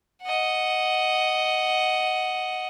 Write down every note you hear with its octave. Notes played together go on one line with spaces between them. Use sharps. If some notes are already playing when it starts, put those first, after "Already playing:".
D#5 F#5